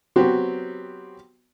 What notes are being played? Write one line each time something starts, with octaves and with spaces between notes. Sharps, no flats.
F#3 B3 C4 F#4 G4